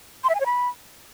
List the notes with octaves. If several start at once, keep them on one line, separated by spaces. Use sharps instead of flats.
C6
E5
G#5
C#5
B5